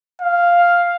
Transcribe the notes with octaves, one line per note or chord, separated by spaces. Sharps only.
F5